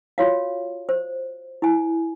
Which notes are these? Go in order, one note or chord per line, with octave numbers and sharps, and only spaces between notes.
F4 F#4 C#5 F5
C5
E4 G#5